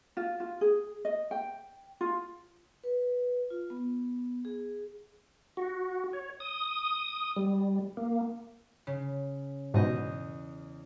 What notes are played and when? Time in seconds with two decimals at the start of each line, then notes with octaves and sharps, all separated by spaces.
0.17 F4
0.40 F4
0.61 G#4
1.05 D#5
1.31 G5
2.01 F4
2.84 B4
3.50 F4
3.70 B3
4.45 G#4
5.57 F#4
6.13 C#5
6.40 D#6
7.36 G3
7.97 A#3
8.87 C#3
9.74 E2 G#2 B2 D#5 G6